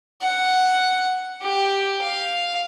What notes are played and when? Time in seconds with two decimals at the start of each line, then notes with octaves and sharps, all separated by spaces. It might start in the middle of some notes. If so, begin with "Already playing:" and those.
0.21 F#5
1.42 G4
2.02 F5